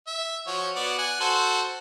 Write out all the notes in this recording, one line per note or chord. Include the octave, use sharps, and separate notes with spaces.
E5
F3 F#4 C#5
B3 F#4 D5
F#5 G#5
F#4 A4 C5